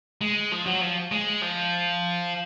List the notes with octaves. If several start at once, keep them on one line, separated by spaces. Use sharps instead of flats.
G#3
F3
F#3
F3
G#3
F3